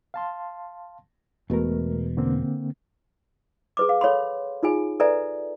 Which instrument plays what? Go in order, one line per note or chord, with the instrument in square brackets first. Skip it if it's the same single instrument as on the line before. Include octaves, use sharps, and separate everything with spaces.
[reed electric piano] F5 A5 C6
[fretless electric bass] E1 B2 [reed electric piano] A3 A#4
[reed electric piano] D3 A#3 C4
[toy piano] G#4 B4 D6
F5
A4 C#5 F5 B5 C6
D#4 F4 G#4 G#5
A4 B4 D5 E5 G#5 A#5